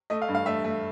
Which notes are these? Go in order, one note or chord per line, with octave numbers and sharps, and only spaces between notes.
A3 D#5
F5
G2
F5
A3 E5
A3